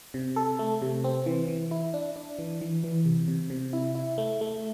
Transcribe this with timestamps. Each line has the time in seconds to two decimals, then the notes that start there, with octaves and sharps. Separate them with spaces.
0.14 C3
0.36 A4
0.59 A3
0.82 C3
1.04 C4
1.26 E3
1.48 E3
1.71 E4
1.94 D4
2.16 D4
2.39 E3
2.61 E3
2.84 E3
3.05 C3
3.28 C3
3.50 C3
3.73 E4
3.95 E4
4.18 A3
4.41 A3